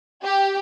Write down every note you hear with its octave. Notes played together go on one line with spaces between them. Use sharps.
G4